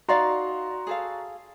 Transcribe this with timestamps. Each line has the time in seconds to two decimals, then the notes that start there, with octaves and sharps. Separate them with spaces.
0.08 D#4 F#4 D5 F5 A#5 C6
0.87 G#4 A4 F5